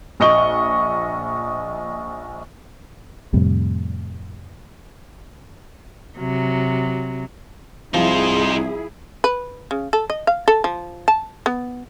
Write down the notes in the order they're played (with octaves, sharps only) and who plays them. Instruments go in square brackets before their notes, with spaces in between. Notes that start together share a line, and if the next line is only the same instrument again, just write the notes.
[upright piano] A#1 D#5 C#6 G7
[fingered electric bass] F2 A2 C3 G3
[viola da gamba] C3 F#3
[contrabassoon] C2 [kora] F3 [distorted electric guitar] D#4 C5 [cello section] E4 G#4
[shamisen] B4
C#3
A4
D#5
F5
A4
F3
A5
B3